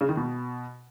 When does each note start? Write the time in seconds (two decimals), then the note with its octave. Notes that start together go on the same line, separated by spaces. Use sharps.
0.01 C#3
0.09 D#3
0.17 B2